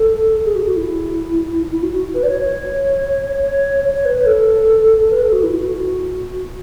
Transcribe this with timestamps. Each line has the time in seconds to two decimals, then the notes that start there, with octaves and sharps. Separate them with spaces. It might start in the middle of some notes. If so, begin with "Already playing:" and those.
Already playing: A4
0.45 G#4
0.55 F#4
0.66 F#4
0.77 E4
1.72 E4
1.83 F#4
1.93 F#4
2.15 B4
2.23 D5
2.29 C#5
2.43 C#5
3.42 C#5
3.84 C#5
3.95 C#5
4.05 B4
4.16 B4
4.26 A4
5.11 B4
5.22 A4
5.32 F#4
5.43 E4
5.54 F#4